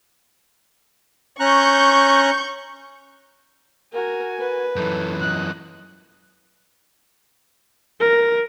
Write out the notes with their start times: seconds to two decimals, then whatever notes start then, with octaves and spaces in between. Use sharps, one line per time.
1.40 C#4 A#5 C#6 F#6 G6
3.93 F#4 A#4 G#5
4.39 B4
4.76 F#2 E3 A4
5.20 D#5 F#6
8.00 A#4